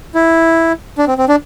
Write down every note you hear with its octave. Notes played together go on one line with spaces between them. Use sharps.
E4
D4
C4
C4
D4